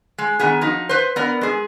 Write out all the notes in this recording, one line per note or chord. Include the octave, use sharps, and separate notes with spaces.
G#3
D#3 B3 G#4
F3 D#4 F#4
B4 C5
B3 A#4 D5
G#3 G#4